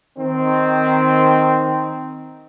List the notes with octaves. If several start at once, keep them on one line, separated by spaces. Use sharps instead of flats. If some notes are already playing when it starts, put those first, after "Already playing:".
D#3 C4